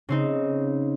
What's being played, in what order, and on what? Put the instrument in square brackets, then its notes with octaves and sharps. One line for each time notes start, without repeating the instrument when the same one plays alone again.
[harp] C#3 C4 D#4